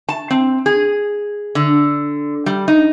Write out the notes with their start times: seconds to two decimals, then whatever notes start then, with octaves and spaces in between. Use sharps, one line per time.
0.09 A5
0.31 C4
0.66 G#4
1.55 D3
2.46 G3
2.68 D#4